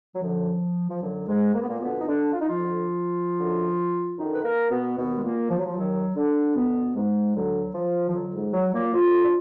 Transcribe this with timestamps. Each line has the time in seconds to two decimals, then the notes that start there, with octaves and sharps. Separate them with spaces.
0.15 F#3
0.22 F#2 D3 F3
0.90 F3
1.02 F#2 D3 F#3
1.28 G#2 G#3
1.55 A#3
1.62 B3
1.69 A#2 A#3
1.80 F2 B2 D3 B3
2.00 D#4
2.07 D3 D4
2.33 F4
2.41 D#4
2.49 F3 F4
2.59 F2 D3
3.39 F#2 D3
4.18 F#2 D3 D#3 D#4
4.34 B4
4.44 A#3 A#4
4.71 B2 B3
4.97 D#2 B2 D#3 B3
5.18 G#3
5.24 A#2 A#3
5.50 F3
5.58 F#3
5.66 F3
5.76 D#2 D#3 F#3
6.16 D3 D4
6.55 D2 B2 D3 B3
6.95 G#2 G#3
7.35 D2 D3 F#3
7.75 F3
8.09 F3
8.14 F2 D3 F#3
8.34 G#2 G#3
8.53 F#3
8.74 A#2 A#3
8.93 F2 D3 F3 F4
9.25 D4